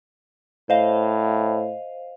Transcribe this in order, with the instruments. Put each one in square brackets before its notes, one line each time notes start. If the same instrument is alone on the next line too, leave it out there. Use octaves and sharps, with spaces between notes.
[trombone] A2 [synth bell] C5 D#5 F5